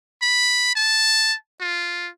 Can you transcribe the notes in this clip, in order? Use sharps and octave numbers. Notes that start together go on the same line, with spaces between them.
B5
A5
F4